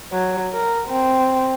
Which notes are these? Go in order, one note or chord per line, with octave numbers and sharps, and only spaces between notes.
F#3
A#4
C4